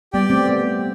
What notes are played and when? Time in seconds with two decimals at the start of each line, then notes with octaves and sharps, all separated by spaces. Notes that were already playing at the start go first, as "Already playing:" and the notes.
0.13 G3 B3 G4 D5 G5
0.30 A3 C4